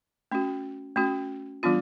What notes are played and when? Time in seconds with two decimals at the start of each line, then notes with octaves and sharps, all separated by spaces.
0.31 A3 C#4 F#4
0.96 A3 C#4 F#4
1.63 E3 G3 B3 D4 F4